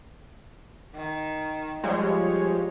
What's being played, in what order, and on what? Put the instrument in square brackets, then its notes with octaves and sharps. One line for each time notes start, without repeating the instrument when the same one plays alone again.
[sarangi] D#3
[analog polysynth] F3 G3 G#3 [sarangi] C#5